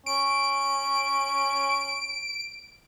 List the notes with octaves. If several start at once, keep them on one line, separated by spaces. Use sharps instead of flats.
C#4 D7